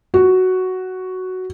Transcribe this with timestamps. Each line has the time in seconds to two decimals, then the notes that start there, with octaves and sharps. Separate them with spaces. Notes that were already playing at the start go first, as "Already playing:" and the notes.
0.14 F#4